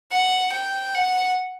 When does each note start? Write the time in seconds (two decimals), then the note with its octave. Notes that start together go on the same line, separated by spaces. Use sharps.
0.12 F#5
0.52 G5
0.94 F#5